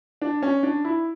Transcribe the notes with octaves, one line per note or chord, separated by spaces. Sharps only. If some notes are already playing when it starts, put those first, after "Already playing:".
D4
C#4
D4
E4